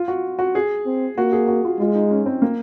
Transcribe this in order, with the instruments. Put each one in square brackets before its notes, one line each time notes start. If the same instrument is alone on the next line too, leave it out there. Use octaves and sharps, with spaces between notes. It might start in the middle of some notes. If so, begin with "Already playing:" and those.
Already playing: [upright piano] F4
F#4
F#4
G#4
[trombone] C4
[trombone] A#3 [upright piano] F#4
[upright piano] G#4
F#4
F4
[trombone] G#3 [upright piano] F4
[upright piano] D#4
C#4
C4
A#3